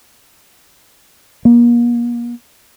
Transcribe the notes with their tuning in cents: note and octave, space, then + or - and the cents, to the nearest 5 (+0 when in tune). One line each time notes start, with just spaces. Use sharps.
A#3 +40